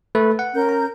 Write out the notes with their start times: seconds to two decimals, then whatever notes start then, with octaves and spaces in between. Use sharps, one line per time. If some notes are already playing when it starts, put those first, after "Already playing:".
0.15 A3 A4 B4
0.39 F#5
0.54 C#4 A#4 G6
0.69 A#5